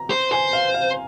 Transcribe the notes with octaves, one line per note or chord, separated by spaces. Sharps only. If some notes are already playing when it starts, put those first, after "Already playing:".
Already playing: A#5
C5
C5 G#5
F5
F5